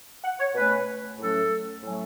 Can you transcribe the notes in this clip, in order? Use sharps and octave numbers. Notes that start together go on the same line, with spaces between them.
F#5
C#5
B2 A3 C#4 B4
A2 F#3 A3 C#4 A4
A2 F#3 A3 C#4